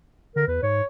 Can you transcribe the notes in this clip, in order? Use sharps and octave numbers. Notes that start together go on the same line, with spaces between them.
D3 A#4
E2 B4
G#2 C#5